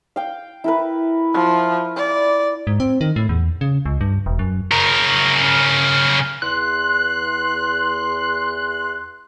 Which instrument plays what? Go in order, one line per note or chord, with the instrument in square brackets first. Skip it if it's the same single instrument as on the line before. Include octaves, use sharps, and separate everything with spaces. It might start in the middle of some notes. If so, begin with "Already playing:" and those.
[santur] F5 G5
E4 A#4 B4
[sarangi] F3
D5
[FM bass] G#2
C4
D#3
A2
E2
C#3
C#2
G2
E1
F#2
[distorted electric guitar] C#3 A#4
[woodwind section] E2 C6 [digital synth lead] F#6